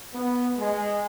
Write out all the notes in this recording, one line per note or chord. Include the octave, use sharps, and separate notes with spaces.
B3
G#3